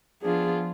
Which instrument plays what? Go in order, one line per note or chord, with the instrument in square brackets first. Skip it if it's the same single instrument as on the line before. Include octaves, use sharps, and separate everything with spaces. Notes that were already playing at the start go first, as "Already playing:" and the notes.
[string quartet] F3 B3 D4 F4 [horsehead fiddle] G#4